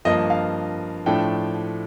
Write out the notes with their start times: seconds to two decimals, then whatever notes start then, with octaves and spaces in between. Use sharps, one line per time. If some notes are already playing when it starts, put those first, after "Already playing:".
0.05 G2 F3 A#3 D#5
0.30 F5
1.06 A2 F3 A3 D4 G5